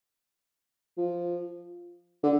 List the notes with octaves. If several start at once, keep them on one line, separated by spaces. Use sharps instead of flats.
F3
D3